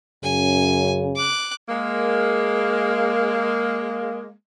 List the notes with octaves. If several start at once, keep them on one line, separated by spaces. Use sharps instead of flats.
F#2 C#3 G#5
D6 F#6
G#3 A#3